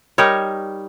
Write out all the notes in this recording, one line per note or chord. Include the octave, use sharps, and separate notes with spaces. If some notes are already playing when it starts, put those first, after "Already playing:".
G3 D#4 A#4 C#5